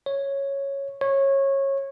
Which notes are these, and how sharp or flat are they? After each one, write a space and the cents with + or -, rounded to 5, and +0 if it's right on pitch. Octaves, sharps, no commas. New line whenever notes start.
C#5 -5
C#5 -20